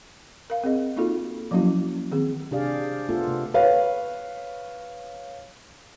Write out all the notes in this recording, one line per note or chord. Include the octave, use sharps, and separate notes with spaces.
A#4 F5
C4 G#4 D#5
A#3 D#4 F4 F#4 A4
F3 F#3 A#3 C#4 E4 F#4
D#3 C4 G#4
C3 D4 G4 G#4 D5 F5
A3 B3 F4 A4
C3
B4 C#5 F5